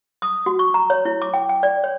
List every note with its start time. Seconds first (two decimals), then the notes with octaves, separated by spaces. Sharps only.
0.22 D#6
0.46 F#4
0.59 C#6
0.74 A#5
0.90 C#5
1.05 E4
1.22 D6
1.34 G5
1.49 G5
1.63 D5
1.84 C#5